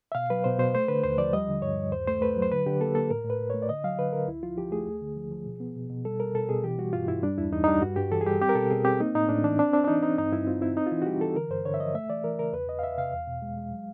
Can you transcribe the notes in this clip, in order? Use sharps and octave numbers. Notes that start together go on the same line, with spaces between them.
E5
B2 F5
F#3 B4
B2 C5
B2 C5
A3 C5
D3 B4
D#2 C5
F3 D5
G3 D#5
D3
G2 C#5
G2
D#2 C5
A3 C5
A3 B4
F#3
C5
D3 B4
D3 G4
A#3 A4
A#3 A4
A2 A#4
A2
B4
A2
A3 C#5
D5
D3 D#5
F#3 F5
D3 B4
D3 A#4
C#2 E4
F3 F4
F3 G4
A3 G#4
D2
D3
F3
F3
B2
B3
B2
B2
G3 A4
G3 A#4
B2 A4
B2 G#4
E3 G4
G3 F#4
G2 F4
G2 E4
G3 D4
E2 E4
E2 D#4
D#4
G3 D4
G2 F#4
G2 G4
E3 A4
G#4
G3 G4
C4 G4
A#4
B2 A4
B2 G#4
C4 G4
A#3 D#4
A2 D#4
A2 D4
E3 D4
C4 D4
C4 D4
D4
E3 D#4
C4 D#4
G2 D#4
G2 E4
C4 F4
C4 E4
C4 D#4
F4
E3 E4
F#4
G3 G4
E3 A4
D3 A#4
G2 C5
D3 C#5
E5
F3 D#5
A3 E5
E3 D5
E3 A#4
C#3 A#4
E2 B4
E2 D#5
F5
E2 E5
C3 F5
E2
B2
G#3
G#3
F#3